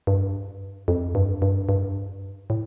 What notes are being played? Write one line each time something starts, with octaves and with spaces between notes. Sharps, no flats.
G2
F2
G2
G2
G2
A2